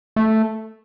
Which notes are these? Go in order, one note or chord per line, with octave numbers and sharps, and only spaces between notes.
A3